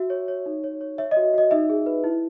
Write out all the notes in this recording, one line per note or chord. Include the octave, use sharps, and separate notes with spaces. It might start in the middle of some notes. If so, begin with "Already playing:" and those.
Already playing: F#4 E5
C#5
C#5
D#4
C#5
C#5
C#5 E5
D#5
F#4
F#4 D#5
D#4 E5
G#4
B4
E4